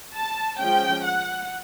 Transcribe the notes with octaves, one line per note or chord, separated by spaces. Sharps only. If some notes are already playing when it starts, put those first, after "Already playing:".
A5
F3 G#3 C#4 G5
F#5